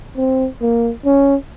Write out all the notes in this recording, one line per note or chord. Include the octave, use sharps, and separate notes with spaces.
C4
A#3
C#4